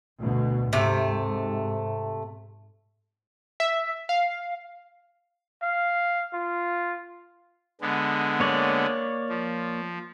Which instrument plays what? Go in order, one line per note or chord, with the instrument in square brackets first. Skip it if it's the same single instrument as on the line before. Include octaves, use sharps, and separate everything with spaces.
[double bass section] D2 B2
[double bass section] G#2 [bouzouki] C3 A3
[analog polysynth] E5
F5
[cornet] F5
F4
[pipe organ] D3 G#3 B3
[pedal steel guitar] A#3 C#5 D5
[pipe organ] F3